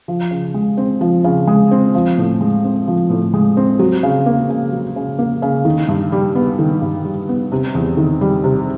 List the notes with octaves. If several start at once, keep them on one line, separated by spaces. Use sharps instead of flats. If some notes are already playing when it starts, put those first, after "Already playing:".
F3
C#3
G#3
C4
F3
C#3
G#3
C4
F3
A2
G#3
C4
F3
A2
G#3
C4
F#3
C#3
A#3
C#3
F#3
C#3
A#3
C#3
D#3
G2
G3
B3
D#3
G2
G3
B3
C3
E2
D#3
G3
C3